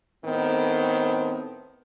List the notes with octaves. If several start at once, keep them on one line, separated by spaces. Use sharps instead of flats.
A2 D#3 B3 C4